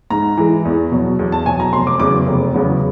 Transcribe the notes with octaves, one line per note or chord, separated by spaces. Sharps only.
G#2 A#5
E3 G#3
E2
B2 F#3
E2
A5
B2 F#3 G#5
A#5
F1 C6
D6
E2 C#3 F#3 B3 D6
F1
E2 C#3 F#3 B3